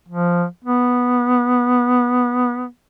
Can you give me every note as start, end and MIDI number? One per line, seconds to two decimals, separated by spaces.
0.09 0.46 53
0.65 2.67 59